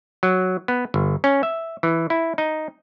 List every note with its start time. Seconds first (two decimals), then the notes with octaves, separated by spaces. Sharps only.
0.23 F#3
0.68 B3
0.94 G1
1.24 C#4
1.43 E5
1.83 E3
2.10 E4
2.38 D#4